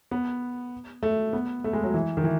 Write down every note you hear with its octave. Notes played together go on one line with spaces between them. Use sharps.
B3
A3
B3
A3
G#3
F#3
E3
D#3
E3